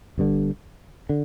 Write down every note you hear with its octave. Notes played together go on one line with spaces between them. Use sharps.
G1 G2 D3
D3